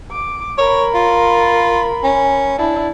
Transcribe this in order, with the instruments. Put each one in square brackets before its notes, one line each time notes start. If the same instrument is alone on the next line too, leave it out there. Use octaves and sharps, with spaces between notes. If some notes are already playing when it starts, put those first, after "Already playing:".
[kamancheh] D6
[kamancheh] A#4 B5 [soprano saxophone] C#5
[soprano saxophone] F4
C#4
[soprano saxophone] D4 [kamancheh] E4